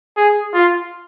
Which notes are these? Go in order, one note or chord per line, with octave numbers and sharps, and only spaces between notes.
G#4
F4